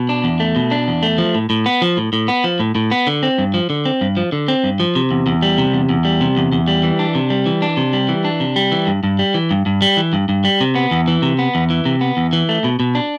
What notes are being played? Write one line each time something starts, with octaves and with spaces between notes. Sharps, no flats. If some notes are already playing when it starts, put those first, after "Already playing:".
Already playing: B2
D4
E2
A3
B2
D4
E2
A3
F3
A2
A2
B3
F3
A2
A2
B3
F3
A2
A2
B3
D3
C4
G2
F3
D3
C4
G2
F3
D3
C4
G2
F3
C3
E2
E2
G3
C3
E2
E2
G3
C3
E2
E2
G3
E3
D4
C3
G3
E3
D4
C3
G3
E3
D4
C3
G3
E3
G2
G2
G3
E3
G2
G2
G3
E3
G2
G2
G3
C3
B3
E2
E3
C3
B3
E2
E3
C3
B3
E2
E3
A3
B2
B2
D4